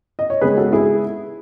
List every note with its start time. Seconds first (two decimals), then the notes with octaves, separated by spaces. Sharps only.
0.19 D#5
0.30 C#5
0.41 C#3 G#3 B3 G#4 B4
0.57 F#4 A4
0.73 E4 G#4